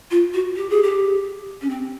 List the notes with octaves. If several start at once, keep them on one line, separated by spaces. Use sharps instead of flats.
F4
F#4
G4
G#4
G4
C#4
C4